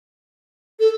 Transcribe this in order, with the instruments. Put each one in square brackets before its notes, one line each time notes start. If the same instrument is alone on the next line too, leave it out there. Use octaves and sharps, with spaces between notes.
[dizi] A4